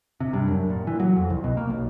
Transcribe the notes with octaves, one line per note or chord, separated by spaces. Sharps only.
C3
G2
F#2
A#2
E3
F#3
F2
C2
B2
A#3
B1